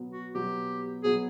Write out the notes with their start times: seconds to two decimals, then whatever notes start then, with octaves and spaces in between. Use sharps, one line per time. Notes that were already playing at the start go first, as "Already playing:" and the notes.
Already playing: B2 F#3 B3
0.11 F#4
0.35 B2 F#3 B3 G4
1.04 B2 F#3 B3 G#4